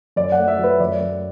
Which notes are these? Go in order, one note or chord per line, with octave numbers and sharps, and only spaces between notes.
F#2 D5
F#5
A3
E5
F#3
B4
F#2 D5
F#2